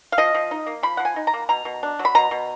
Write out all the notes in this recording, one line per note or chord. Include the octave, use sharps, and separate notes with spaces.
F5
F3 D#5
F3
D#4
A#3
F3 B5
F3 F#5
G#5
D#4
A#5
A#3
B2 A#5
B2
D4
F#3
B5
B2 A#5
B2